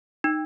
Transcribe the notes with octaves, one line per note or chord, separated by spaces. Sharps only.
D#4